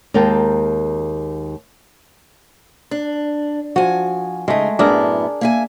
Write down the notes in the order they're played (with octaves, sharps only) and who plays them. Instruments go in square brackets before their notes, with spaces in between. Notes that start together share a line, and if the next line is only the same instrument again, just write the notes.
[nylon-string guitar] D#2 G#3 A#4 F5 G5 A5
[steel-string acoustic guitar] D4
[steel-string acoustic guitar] F3 G#5 [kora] F#4
[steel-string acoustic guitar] C#3 D#4 [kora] G#3 A3
[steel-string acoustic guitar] F#2 A2 B3 [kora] D4 G#4 A#4
[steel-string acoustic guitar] A#3 E5 G#5